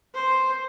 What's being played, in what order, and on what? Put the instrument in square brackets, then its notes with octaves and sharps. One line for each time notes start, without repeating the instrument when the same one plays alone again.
[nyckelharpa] C5